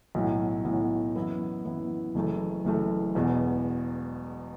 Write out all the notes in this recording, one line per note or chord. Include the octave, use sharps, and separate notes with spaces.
B1 A2 F#3
B1 A2 F#3
F#2 E3 B3 E4
F#2 E3 B3 E4
F#1 F#2 E3 A3
F#1 F#2 E3 A3
E1 E2 B2